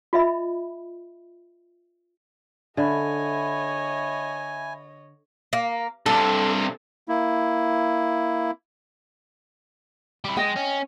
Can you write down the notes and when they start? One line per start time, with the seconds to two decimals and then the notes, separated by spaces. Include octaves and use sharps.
0.13 F4 D#5 E5 B5
2.77 D3 C#5 D#5 E5 G#5 B5
5.53 A#3
6.06 G2 C3 A4
7.09 A#3 E4
10.25 G3 E4
10.37 G#3 D#5 G5
10.56 C#4